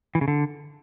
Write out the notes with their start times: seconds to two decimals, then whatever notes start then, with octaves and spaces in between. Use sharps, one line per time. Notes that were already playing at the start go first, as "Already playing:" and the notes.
0.15 E3
0.21 C#3
0.28 D3